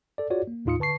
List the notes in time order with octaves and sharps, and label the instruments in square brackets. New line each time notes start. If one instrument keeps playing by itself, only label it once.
[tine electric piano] A4 D5
F4 F#4 G#4 C#5 D5
A#3
D#2 A2 D#4 F4 D#6 C#7
D3 B4 A5 C#6 C7